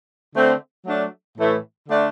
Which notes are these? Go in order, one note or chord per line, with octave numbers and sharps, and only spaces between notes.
D3 A3 C4
F#3 A3 D4
A2 E3 A3
D3 A3 D4